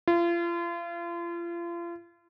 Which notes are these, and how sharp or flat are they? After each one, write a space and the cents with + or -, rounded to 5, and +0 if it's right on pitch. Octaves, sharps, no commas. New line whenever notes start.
F4 -35